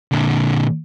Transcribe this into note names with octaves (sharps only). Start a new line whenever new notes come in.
A#2 D3